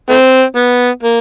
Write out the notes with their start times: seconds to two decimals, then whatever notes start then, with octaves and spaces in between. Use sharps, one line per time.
0.10 A3 C4
0.56 B3
1.03 A#3